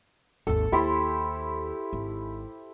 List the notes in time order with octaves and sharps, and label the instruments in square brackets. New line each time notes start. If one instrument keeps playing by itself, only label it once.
[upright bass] G#1 D#2 [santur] A4
[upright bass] D#2 [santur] E4 G4 C5
[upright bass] G#1